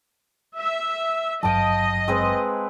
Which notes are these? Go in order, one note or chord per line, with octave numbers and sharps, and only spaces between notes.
E5
G#1 G2 F#3 D#5 F5 G5 A5
G#3 C4 B4